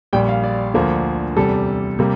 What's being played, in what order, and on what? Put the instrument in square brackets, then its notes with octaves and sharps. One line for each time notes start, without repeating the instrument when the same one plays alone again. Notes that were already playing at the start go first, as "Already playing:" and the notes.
[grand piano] A#1 A#2 G3 G5
F5
D5
D2 D3 F3 A#3
E2 C3 G3 A4
C3 G3 A#3